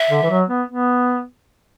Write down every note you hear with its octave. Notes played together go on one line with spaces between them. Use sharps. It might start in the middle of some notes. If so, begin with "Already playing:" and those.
Already playing: E5
D3
E3
F#3
B3
B3